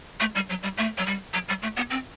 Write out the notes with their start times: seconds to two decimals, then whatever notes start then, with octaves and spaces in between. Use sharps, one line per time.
0.20 A3
0.35 G3
0.49 F#3
0.63 G3
0.77 A3
0.98 F#3
1.06 G3
1.33 F#3
1.49 G3
1.62 A3
1.77 B3
1.90 C4